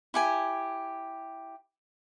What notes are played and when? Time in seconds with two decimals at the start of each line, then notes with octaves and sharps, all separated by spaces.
0.14 E4 G4 G#5